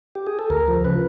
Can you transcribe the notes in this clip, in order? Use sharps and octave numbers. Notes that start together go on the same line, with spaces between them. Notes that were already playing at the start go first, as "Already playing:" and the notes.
G4
G#4
A4
D2 A#4
F3
C#3 B4